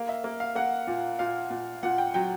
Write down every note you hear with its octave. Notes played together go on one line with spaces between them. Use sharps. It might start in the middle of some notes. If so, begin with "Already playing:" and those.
Already playing: A#3 F5
E5
A#3
F5
A#3 F#5
A#2
A#2 F5
A#2
A#2 F#5
G5
F#3 G5